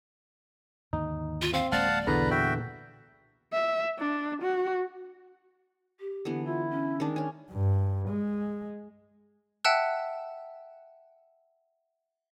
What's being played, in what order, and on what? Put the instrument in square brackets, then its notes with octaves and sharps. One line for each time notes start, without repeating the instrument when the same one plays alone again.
[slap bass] D#2 G#2 D3 [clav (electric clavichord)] D#4
[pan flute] F4
[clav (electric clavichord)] C4 [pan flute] F5
[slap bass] D1 G#3 A#3 [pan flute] D5 [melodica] F5 F#5 A5
[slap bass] B1 [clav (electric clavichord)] E2 D3 B3 [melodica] B4 A#5
[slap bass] A#2 [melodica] F#4 E5 G5
[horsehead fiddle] E5
D4
F#4
[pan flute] G4
[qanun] D3 E3 B3
[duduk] E4 [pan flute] F4
[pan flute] C#4
[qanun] D#3 G#3 D4
C#4 G#5
[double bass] G2
G#3
[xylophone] E5 F#5 G5 A5 E6 F#6